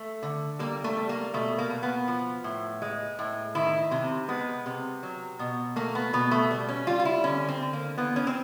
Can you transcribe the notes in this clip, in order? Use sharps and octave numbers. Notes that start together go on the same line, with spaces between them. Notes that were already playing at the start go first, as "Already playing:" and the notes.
Already playing: A3
D3
G3 A#3
A3
G3
A#3
B2 A3
A#3
B2
B3
F3
A2
G#3
A2
D#3 E4
C3
G#3 B3
C3
F#3
B2
A3 A#3
B3
B2 B3
A3
G3
C#4
G3 F4
F4
E4
D3 C#4
C4
D3
A#3
E3 B3
C#4
C4